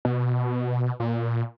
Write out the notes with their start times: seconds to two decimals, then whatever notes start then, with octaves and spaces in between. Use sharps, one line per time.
0.05 B2
1.00 A#2